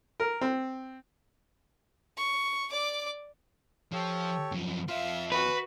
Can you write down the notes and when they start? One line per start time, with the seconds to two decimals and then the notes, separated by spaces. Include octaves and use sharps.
0.20 A#4
0.41 C4
2.17 C#6
2.71 D5 D6
3.93 F3 G4 A4 C#5
4.52 F#2 F3
4.88 F2 F4 E5 F5
5.32 C#4 F#4 B4